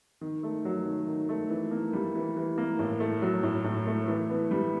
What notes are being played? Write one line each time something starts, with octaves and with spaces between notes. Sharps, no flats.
D#3
A3
F#3
D#3
D#3
A3
E3
A#3
G3
E3
E3
A#3
A2
A3
F#3
A2
A2
A3
E3
B3
G3